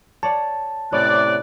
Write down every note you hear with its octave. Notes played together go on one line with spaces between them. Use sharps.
C#5 D5 F#5 A5
A2 C3 B3 C#4 D5 F#6